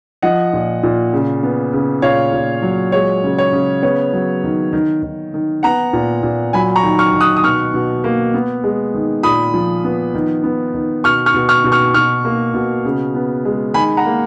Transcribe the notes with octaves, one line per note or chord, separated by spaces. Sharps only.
F3 D#5 F#5
A#2
A#2
C#3
B3
C#3
A#2 C#5 F5
A#2
F#3
G#3 C#5
C#3
C#5
C#3
B3 C#5
F#3
D#3
D#3
D#3
D#3
B3 F#5 A#5
A#2
A#2
F#3 G#5 B5
A#5 C#6
D#3
C#6 F6
D#3
D#6 F#6
D#6
B2 C#6 F6
B2
A#3
B3
G#3
D#3
A#2 B5 D#6
F3
B3
D#3
B3
D#3
B2 C#6 F6
C#6 F6
B2
C#6 F6
B2
C#6 F6
B2 C#6 F6
A#3
B2
C#3
B3
G#3
D#3 G#5 B5
F#5 A#5
A#3